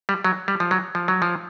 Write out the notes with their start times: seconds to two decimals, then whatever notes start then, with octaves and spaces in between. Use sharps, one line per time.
0.09 G3
0.24 F#3
0.48 G3
0.60 F3
0.71 F#3
0.95 F3
1.08 F#3
1.22 F3